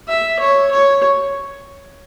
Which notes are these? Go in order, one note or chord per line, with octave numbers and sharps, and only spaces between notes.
E5
C#5
C#5